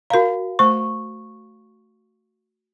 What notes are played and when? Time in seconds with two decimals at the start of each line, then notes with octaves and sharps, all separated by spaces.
0.10 F#4 A#4 F5 A#5
0.59 A3 C5 C#6